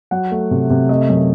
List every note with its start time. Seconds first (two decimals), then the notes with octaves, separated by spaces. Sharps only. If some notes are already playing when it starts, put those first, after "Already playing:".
0.11 F#3 F#5
0.31 A3
0.51 C3
0.70 C3
0.89 A3 D#5
1.09 F#2